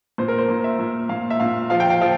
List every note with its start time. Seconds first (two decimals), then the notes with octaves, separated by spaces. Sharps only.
0.18 A#2 C5
0.28 A#4
0.38 C5
0.49 A#2
0.64 E5
0.79 A#2
1.09 A#2 F5
1.30 E5
1.40 A#2 F5
1.70 F3 F5
1.80 G5
1.90 F5
2.01 F3 F5